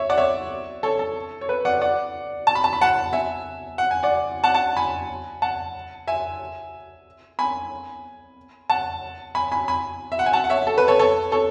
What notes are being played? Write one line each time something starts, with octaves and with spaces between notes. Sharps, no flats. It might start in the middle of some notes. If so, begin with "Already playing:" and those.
Already playing: C#5 E5
D5 F#5
C#5 E5
A4 C#5
A4
C#5
B4
D5 F#5
D5 F#5
A5
B5
A5
B5
F#5 A5
E5 G#5
F#5
G#5
D5 F#5
F#5 A5
F#5 A5
G#5 B5
F#5 A5
E5 G#5
G#5 B5
F#5 A5
G#5 B5
G#5 B5
G#5 B5
E5
F#5
G#5
F#5 A5
F#5
C#5 E5
A4
B4
A4 C#5
A4 C#5
A4 C#5